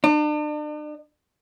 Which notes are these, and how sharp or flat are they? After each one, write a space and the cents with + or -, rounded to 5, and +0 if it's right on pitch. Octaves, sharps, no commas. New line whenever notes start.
D4 +40